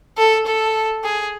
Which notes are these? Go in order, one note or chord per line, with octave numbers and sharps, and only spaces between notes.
A4
A4
G#4